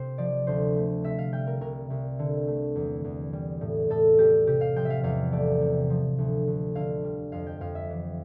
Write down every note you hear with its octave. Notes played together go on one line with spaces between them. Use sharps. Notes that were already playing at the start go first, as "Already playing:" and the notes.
Already playing: C3 C5
F3 D5
D2 C5
A3
C3 E5
F5
G3 G5
A#4
C2 A#4
C2
D3
A3
E2
E2
G3
A2
A2 A4
G3 G4
C3 G4
F5
F3 G5
E5
F5
E2 F5
A3 D5
C3
F3
D2
D2
D3 F5
G3
F2 F5
G5
F2 F5
E5
E3